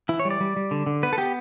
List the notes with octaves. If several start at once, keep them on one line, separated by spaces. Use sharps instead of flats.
E3 E4
C#5
G3
D5
G3
G3
D3
D3
B3 B4
A4
B3 G4